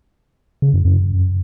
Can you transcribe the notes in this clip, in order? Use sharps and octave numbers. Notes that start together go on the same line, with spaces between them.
C#3
F#2
F#2